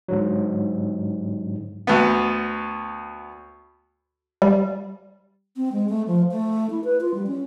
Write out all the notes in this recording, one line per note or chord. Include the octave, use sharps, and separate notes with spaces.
G#2 D3 F#3
D2 B3
G3
C4
G#3
A3
F3
A3
E4
B4
F4
G3
C#4